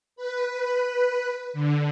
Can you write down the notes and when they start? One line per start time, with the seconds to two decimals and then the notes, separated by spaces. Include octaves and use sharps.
0.16 B4
1.53 D3